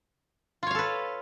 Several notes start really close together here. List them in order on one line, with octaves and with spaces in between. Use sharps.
F4 C#5 F5 A4 B4